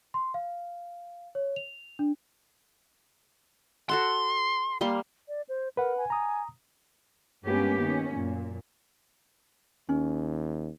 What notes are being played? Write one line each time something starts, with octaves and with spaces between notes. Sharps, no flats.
C6
F5
C#5
F7
D4
F#4 A4 F#5 C6
G3 A#3 C6
D5
C5
A#4 B4 F#5
G#5
A#5 D#6
G2 G#3 A#3 B3 C#4 G4
D#3 C#4
F#2 A#2
D#2 C#4